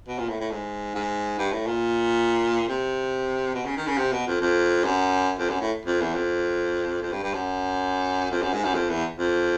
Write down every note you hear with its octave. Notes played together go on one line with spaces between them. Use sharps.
B2
A#2
A2
A2
G#2
G#2
G2
A2
A#2
C3
B2
C#3
D#3
C#3
C3
B2
F2
F2
F#2
F2
F#2
A2
F2
E2
F2
F2
G2
G2
F#2
F2
F#2
G#2
F#2
F2
E2
F2